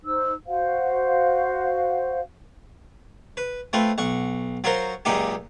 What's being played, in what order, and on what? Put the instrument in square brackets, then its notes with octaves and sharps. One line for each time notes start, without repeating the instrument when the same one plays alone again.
[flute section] D#4 C5 E6
F#4 C5 F5 F#5
[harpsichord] B4
A3 C4 F4 B4
B1 F#5 C#6
F#3 F4 F#4 A#4 C5
C#2 F#2 A#2 D#4 G4